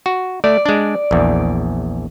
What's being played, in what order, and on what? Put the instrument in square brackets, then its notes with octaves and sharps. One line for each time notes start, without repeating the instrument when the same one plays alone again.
[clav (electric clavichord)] F#4
[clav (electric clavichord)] A3 [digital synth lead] D5
[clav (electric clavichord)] G#3 D4
A#1 E2